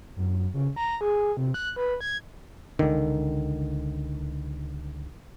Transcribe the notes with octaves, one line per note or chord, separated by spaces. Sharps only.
F#2
C#3
A#5
G#4
C3
F#6
B4
G#6
C#2 D3 D#3